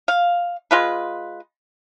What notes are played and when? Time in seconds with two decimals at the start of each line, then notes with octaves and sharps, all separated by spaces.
0.08 F5
0.71 G#3 F4 B4